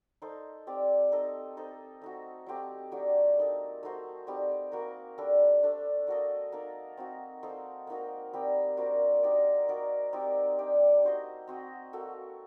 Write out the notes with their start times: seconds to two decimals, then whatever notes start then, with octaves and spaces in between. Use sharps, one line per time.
0.22 D#4 A4 C5
0.67 C4 G4 D5
1.12 D#4 A4 D#5
1.57 D#4 A4 C5 D#5
2.01 A3 D#4 F#4
2.46 F#3 A3 C4 G4
2.92 F#3 A3 D4 G4
3.38 A#3 D#4 A4
3.83 A3 D#4 F#4 C5
4.27 G3 C4 D#4 G4
4.72 A#3 F#4 A#4
5.18 G3 D4 A4
5.63 A3 D4 A4
6.07 A#3 F#4 A4 D#5
6.52 A#3 D#4 A4
6.97 C4 D#4 F#4
7.43 A#3 D#4 A4 C5
7.87 A#3 D#4 F#4
8.33 G3 C4 G4 A#4
8.77 A#3 D4 F#4 C5
9.23 D#4 G4 A#4 D5
9.68 D#4 F#4 A#4 D5
10.13 C4 D#4 G4 D5
10.59 D4 G4 D5
11.03 D#4 F#4 C5 D#5
11.48 C4 F#4 C5 D#5
11.93 A#3 F#4 A4